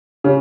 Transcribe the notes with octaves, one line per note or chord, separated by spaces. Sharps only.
C#3